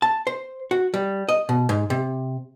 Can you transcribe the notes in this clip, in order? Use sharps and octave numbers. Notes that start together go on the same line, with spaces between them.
A5
C5
F#4
G3
D#5
B2
G#2
C3